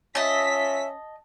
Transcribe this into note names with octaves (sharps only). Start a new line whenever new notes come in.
C#4 F4 D#5 E5 A5 B6